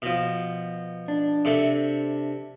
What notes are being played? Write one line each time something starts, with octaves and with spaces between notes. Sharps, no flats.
B2 F3
D4
C3 A3